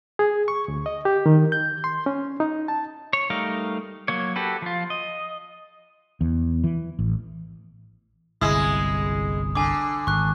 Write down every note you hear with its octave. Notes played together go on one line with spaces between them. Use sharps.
G#4
C#6
D2
D#5
G4
D#3
G6
C6
C#4
D#4
A5
C#5
G3 A3 D#4 A#4 F5
F#3 A#3 C#5
F#4 G4 A4 B4
F3 F4
D#5
E2
E3
A1
G1 C2 G#3 E4 D#6
D3 G#5 D6
G#1 C#6 F#6